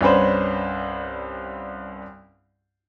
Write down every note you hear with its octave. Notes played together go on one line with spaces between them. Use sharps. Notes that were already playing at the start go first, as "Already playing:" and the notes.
C2 G2 C#4 D4 B4 C5